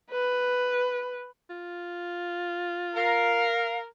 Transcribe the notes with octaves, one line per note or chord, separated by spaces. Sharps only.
B4
F4
A#4 F5